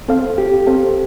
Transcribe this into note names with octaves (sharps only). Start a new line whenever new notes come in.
C4 A4 C5 F5
G4
C4 A4 C5 F5